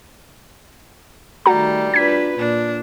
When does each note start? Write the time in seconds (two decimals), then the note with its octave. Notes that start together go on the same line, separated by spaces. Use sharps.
1.46 D#3 G3 A3 F#4 A#5
1.94 D4 F4 B4 G#6 B6
2.38 A#2 D4